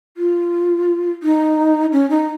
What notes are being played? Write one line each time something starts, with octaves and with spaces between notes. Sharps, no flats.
F4
D#4
C#4
D#4